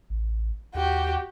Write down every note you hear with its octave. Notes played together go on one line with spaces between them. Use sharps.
A1
D#2 F#4 G4